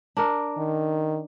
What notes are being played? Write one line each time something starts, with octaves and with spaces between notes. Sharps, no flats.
D4 A#4
D#3